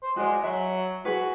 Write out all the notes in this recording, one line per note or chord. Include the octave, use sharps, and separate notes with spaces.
C5
G#3 F#4 D5
F#3 E5
F#4 G#4 B4